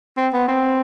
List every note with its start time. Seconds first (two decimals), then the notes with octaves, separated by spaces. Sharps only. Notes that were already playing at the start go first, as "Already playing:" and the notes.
0.17 C4
0.33 B3
0.48 C4